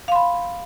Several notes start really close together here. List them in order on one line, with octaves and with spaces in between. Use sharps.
F5 C6 B5